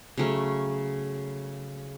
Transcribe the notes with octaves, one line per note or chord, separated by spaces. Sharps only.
C#3 F#3 A3 C#4